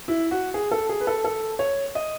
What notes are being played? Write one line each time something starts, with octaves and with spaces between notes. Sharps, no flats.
E4
F#4
G#4
A4
G#4
B4
A4
A4
C#5
D#5